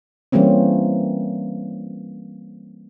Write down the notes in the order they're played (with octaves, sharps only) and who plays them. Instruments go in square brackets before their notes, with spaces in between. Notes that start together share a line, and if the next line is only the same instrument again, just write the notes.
[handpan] E3 G3 A#3 C4 C#4